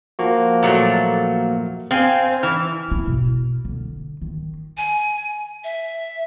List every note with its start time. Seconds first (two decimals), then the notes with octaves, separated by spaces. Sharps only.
0.19 F3 A#3 F#4
0.63 A#2 F#3 A3
1.91 C4 F5 G#5
2.43 E3 F6
2.92 E4
3.07 B2
3.65 D3
4.22 D#3
4.77 G#5
5.64 E5